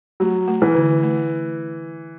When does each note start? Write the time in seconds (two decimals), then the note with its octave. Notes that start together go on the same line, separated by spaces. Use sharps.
0.20 F#3 A3
0.48 A3
0.62 E3
0.75 D3
1.03 A3